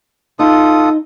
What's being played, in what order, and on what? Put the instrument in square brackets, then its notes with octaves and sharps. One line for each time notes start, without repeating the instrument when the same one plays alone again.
[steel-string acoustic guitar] D#4 [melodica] F4 A4 D#6